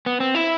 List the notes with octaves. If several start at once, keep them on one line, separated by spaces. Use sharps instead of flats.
B3
C4
E4